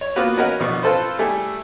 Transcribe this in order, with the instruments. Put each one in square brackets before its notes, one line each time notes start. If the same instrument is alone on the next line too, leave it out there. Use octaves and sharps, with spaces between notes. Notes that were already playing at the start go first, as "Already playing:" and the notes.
[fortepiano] C#5
A#3 B3 F4 F#4 B4
C#4 F#4 A#4 B4 D#5 F#5
A#1 B2 B3 C#6
C4 F4 A4 B4 C5
G3 A3 G#4 A4